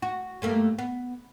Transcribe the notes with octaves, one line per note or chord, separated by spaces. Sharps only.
F#4
G2 A3 A#3
B3